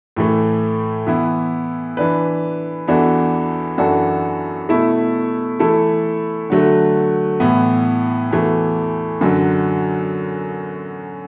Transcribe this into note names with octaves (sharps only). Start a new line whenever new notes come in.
A2 E3 A3
E3 B3 E4
E3 D4 B4
E2 E3 D4 F#4 A4
F#2 E3 D4 F#4 A4
B2 A3 E4 A4
E3 A3 E4 A4
D3 F#3 A3
A2 E3 B3
E2 E3 A3 F#4
F#2 D3 F#3